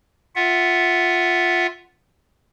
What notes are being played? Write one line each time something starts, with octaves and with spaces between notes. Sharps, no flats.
F4 E5 F#5